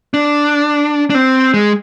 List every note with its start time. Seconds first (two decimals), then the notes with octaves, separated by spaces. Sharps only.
0.14 D4
1.10 D4
1.15 C4
1.54 G#3